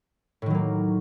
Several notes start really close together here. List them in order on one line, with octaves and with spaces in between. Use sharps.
A2 D#3 F#3 A#3